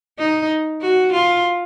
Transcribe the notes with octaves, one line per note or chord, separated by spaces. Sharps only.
D#4
F#4
F4